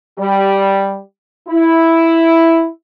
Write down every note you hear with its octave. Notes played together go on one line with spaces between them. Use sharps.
G3
E4